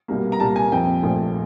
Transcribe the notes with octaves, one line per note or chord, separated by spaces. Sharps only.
C2 B2 G3 A#3
A#5
C2 A#2 G3 A#3 A5
G#5
F2 C3 F3 G5
A#1 A#2 F3 A3